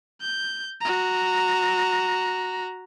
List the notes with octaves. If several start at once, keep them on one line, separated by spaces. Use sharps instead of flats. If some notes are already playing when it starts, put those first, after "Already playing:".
G6
F#4 A#5